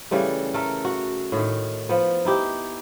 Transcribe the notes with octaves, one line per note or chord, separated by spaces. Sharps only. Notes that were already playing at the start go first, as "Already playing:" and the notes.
C#3 E3 G3 A3
A3 A4 A#4
F#4
A2 D#3
F3 B3
D#4 E4 G4